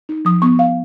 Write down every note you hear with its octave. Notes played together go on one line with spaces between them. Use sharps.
D#4
F3 D#6
B3 C#6
F5